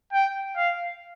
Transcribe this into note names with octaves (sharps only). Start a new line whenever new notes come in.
G5
F5